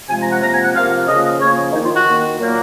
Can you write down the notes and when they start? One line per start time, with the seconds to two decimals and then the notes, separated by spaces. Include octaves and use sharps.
0.09 C3 F3 G#3 G#5
0.20 A#5
0.31 F#5
0.41 C3 F3 A#3 A#5
0.53 G#5
0.64 F#5
0.74 C3 F3 A#3 F5
1.07 C#3 F3 A#3 D#5
1.40 C#3 F3 A#3 C#5
1.73 D#3 A#3 D#4
1.84 F4
1.95 F#4
2.06 D#3 A#3
2.38 A#2 F#3 A#3